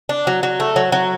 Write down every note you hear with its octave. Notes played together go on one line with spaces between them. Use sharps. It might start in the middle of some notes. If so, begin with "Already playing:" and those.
D4
F#3
F#3
A3
F#3
F#3